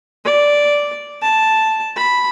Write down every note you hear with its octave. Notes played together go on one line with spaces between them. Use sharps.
D5
A5
B5